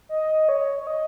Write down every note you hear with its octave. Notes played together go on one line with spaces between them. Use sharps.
D#5
C#5
C#5
D#5